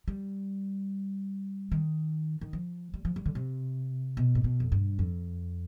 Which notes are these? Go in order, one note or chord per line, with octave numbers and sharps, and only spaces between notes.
G3
D#3
D#3
F3
G3
F3
G3
D3
C3
B2
G#2
B2
F2
G2
F2